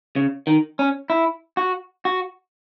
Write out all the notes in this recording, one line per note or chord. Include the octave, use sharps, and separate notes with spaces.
C#3
D#3
C#4
E4
F#4
F#4